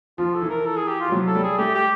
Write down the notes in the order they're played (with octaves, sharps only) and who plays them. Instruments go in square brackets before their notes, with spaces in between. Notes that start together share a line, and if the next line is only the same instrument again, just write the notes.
[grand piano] F3 [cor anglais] F4
[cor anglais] A4
[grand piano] E3
[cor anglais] A#4
A4
G#4
G4
F4
[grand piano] F3
F#3
[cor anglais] A4
[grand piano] G3
[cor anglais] G#4
[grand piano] A3 [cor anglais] G4
[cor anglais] G4